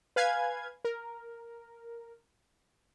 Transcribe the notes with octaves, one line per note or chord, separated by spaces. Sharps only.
B4 F5 G#5 G#6
A#4